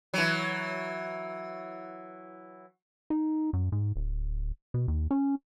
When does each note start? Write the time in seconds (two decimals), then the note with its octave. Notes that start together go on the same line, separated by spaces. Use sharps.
0.14 E3 F#3
3.10 D#4
3.53 F#2
3.72 G#2
3.96 D1
4.74 B2
4.88 D#2
5.11 C#4